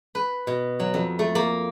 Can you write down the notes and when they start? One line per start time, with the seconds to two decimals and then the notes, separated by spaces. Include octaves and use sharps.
0.15 B4
0.47 B2
0.80 F#3
0.94 F2
1.19 A3
1.35 A#3